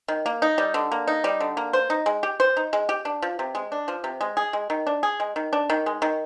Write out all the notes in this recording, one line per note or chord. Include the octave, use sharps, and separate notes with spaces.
D#3
A#3
D#4
G3
D3
A#3
D#4
G3
D3
A#3
C5
D#4
G#3
G4
C5
D#4
G#3
G4
D4
F3
C3
G#3
D4
F3
C3
G#3
G#4
G#3
D#3
D4
G#4
G#3
D#3
D4
D#3
G#3
D#3